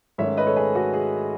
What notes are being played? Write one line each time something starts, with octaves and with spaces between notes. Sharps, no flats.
G#2 D#3 A3 C#4 C#5 E5
B4 D#5
A4 C#5
G#4 B4
F#4 A4
G#4